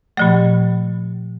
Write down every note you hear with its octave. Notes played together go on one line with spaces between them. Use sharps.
A#2 F3 A3